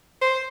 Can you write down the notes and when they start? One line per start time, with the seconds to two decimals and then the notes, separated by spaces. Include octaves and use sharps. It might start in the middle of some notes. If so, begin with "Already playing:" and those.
0.22 C5